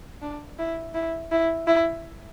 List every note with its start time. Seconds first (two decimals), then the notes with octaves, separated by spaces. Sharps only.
0.22 D4
0.59 E4
0.94 E4
1.32 E4
1.67 E4